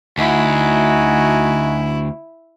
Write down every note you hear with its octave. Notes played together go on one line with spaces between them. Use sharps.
D2 D#4 E4 F#4 G#5